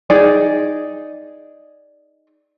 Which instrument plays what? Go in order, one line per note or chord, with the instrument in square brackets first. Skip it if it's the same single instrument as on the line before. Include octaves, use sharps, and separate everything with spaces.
[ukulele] D#4 G#4 D5